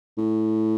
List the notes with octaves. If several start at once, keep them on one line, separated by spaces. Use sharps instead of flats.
A2